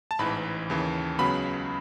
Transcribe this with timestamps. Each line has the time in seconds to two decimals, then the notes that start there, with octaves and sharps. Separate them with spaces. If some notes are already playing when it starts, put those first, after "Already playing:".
0.11 A5
0.19 A1 G#2 E3 B5
0.70 D#2 C#3 E3
1.19 C#2 C#3 F#3 B3 B5